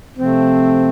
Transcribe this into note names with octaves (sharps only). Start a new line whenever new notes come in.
C3 F3 A3 C4